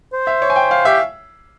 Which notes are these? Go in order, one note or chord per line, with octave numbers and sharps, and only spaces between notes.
C5
E5
C#5
G#5
G5
F5
G4 E5